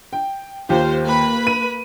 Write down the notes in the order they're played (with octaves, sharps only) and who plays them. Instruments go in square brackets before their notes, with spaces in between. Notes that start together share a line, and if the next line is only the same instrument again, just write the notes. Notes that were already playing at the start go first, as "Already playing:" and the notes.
[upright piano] G5
[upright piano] D#2 F4 G4 [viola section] C5 F5
[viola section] A#3 B4 B5
[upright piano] D#7